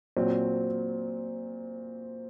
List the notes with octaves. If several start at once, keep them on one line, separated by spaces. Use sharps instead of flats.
A#2 F#3 C4